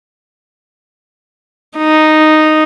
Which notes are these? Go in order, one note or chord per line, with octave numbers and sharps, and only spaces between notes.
D#4